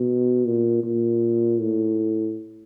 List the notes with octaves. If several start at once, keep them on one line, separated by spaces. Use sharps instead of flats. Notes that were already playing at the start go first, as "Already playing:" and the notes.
Already playing: B2
A#2
A#2
A2